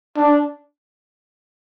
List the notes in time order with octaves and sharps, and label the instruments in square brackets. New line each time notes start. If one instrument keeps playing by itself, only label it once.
[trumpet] D4